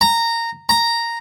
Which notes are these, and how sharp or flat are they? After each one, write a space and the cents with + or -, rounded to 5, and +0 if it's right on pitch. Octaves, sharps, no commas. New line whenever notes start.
A#5 -15
A#5 -5